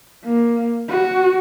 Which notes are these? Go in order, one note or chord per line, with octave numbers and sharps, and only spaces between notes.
A#3
F#4